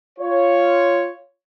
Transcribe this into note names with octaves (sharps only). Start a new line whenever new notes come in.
F4 C#5